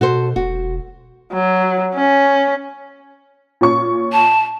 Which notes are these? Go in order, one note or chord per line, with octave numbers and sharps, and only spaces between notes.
B2 F#4 A4 C5
E1 F#4
F#3
C#4
A#2 C#4 C#6
A5